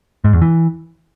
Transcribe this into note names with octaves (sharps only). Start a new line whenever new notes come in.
G#2
E2
E3